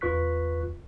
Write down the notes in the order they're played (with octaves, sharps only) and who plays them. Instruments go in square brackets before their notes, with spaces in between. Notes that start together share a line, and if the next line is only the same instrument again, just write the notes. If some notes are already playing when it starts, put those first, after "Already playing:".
[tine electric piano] E2 F4 B4 C#6 F#6 B6